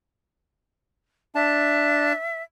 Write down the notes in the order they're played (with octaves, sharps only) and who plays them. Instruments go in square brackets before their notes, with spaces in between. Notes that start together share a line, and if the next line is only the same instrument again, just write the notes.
[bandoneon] D4 A5 [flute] E5